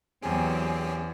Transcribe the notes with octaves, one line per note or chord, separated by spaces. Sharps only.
E2 F#3 C4 C#4 G4 G#4 G#5 D7